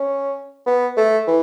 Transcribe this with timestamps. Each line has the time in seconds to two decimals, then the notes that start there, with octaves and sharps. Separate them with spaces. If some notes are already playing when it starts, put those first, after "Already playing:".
Already playing: C#4
0.66 B3
0.97 A3
1.27 E3